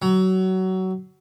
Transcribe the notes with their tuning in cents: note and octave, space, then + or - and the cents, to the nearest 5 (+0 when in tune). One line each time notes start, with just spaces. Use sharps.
F#3 +20